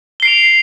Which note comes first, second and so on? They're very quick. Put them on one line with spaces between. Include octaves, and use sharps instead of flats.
G7 C7 D7 F7